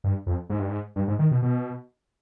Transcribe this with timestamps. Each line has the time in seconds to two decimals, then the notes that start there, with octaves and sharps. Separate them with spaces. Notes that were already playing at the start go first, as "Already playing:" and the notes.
0.04 G2
0.27 F2
0.50 G#2
0.59 G2
0.69 G#2
0.96 G2
1.08 G#2
1.19 D#3
1.31 B2
1.42 B2